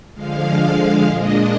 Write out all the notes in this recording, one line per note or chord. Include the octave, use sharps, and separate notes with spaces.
D3 F3 G#3 F5
A#2 G#3 D4 D#5